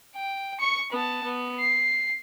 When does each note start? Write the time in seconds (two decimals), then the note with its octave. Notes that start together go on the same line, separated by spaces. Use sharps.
0.15 G5
0.60 C#6 C#7
0.92 B3 A5
1.24 B3
1.60 C7